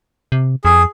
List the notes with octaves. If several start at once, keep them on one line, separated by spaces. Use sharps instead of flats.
C3
F2 G#4